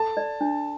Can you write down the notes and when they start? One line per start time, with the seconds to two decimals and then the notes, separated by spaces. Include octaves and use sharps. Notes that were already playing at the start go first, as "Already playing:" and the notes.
Already playing: A4 A5
0.17 D5
0.41 D4